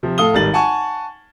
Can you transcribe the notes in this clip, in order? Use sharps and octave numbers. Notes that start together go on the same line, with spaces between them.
C3 F3
A2 A4 F5 D#6 G7
G#1 G3 A6 F#7
F#5 G#5 A5 C#6